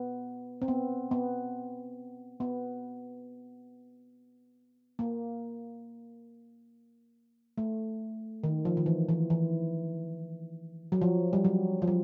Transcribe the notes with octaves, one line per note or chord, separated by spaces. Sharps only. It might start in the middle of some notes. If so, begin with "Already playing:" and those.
Already playing: B3
C4
B3
B3
B3
A#3
A3
D#3
F3
D#3
E3
E3
E3
F#3
F3
G3
F#3
F3
F#3